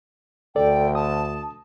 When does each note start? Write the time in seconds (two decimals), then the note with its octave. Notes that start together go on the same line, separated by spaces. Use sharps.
0.56 D2 A4 D5 G5
0.95 A5 D#6